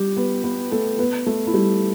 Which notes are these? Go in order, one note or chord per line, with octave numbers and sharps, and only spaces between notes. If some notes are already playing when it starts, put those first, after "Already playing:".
Already playing: G3 G4
B3 B4
B3 B4
A3 A4
B3 B4
A3 A4
E4
G3 G4